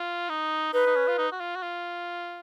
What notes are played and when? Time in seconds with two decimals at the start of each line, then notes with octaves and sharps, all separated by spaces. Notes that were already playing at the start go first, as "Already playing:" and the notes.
Already playing: F4
0.29 D#4
0.73 D#4 B4
0.87 D#4
0.96 C#4
1.07 F4
1.18 D#4
1.32 F#4
1.40 F4
1.56 F#4
1.63 F4